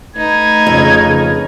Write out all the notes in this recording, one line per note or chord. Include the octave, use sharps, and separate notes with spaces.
A3 D#4 B4 G#6
F2 C#3